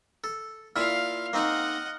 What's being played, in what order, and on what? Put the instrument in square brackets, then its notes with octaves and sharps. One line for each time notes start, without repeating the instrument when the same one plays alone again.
[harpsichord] A4
[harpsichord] A#2 E4 F4 [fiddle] F5 [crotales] F6
[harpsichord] A#3 C4 D#4 [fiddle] D#5 F#5